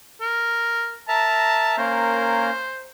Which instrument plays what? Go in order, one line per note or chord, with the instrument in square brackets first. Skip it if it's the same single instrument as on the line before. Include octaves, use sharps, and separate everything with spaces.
[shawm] A#4
[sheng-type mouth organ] A#4 E5 A#5 [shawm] A5
[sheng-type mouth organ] A#3 C#4 A#4 [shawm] C5